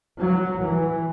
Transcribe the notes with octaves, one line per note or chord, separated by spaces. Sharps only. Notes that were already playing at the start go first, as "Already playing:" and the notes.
F#3
E3